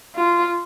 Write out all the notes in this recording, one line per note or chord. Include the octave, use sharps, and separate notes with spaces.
F4